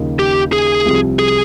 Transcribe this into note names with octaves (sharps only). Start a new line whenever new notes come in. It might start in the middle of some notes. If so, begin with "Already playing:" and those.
Already playing: D#2 C#3 F3 A#3 D#4
G4
G#4
C2 C3 F3 C4
G#4